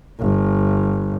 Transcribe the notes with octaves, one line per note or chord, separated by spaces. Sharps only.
G1